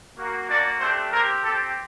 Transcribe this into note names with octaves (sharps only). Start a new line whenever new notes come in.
A#3 F#4
A#3 D4 F#4 D5
A3 C4 D4 G4 C5
A#3 C4 G4 A#4
C4 G4 A4